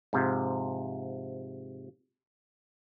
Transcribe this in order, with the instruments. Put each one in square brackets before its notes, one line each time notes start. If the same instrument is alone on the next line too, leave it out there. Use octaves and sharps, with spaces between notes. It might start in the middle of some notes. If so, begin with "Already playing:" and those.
[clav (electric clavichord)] G#2 C3 F3